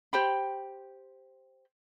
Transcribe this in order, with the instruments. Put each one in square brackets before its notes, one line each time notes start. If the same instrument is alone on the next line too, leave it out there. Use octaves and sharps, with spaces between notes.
[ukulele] G4 C5 G5 B5